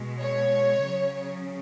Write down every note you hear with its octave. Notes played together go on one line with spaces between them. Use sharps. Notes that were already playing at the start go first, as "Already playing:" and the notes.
Already playing: B2 G#3
C#5
C#3 F#3